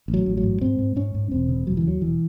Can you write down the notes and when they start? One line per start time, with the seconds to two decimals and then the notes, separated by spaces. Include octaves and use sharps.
0.08 A1
0.14 F#3
0.26 A1
0.37 F#3
0.43 G#2
0.61 G#2 C4
0.79 G#2
0.96 G#2 C#4
1.15 G#2
1.31 E1 C4
1.49 C#3
1.67 E1 F#3
1.77 E3
1.85 D#2 F#3
2.02 E1 E3